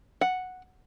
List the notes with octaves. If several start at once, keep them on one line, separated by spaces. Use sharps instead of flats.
F#5